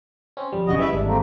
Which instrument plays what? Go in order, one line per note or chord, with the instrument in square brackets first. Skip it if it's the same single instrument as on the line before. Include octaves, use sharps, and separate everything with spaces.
[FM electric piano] C4 C#4
F2 G3
[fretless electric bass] F#1 F#2 C#3 [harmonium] F#4 D#5
[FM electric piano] E3 G3 G#3 [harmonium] E4 B4 E5
[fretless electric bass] G#1 [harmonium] D4
[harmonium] A3 A#3 C4